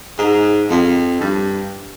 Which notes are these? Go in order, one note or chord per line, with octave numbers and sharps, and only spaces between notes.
G#2
F2
G2